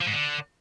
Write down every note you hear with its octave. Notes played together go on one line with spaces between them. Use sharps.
F3
G#2
D3